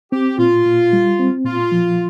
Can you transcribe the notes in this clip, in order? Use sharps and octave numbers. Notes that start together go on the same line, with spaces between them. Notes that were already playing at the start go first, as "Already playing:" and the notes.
C4 G4
A#2 F4
A#2
G3
C4
A#2 F4
F3